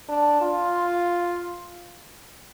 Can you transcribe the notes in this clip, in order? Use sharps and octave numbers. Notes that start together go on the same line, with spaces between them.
D4
F4